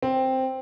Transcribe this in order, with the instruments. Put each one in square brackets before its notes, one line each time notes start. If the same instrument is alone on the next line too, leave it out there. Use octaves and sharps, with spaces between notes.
[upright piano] C4